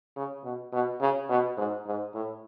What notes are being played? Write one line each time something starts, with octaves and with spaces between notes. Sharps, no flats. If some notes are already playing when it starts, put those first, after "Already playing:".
C#3
B2
B2
C#3
B2
G#2
G#2
A2